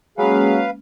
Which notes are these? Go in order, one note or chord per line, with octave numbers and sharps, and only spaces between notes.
F#3 G#3 A#3 C#4 G#4 B4 F5